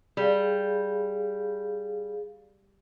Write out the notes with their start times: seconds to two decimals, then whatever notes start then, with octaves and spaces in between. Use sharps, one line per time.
0.17 G3 G#4 F5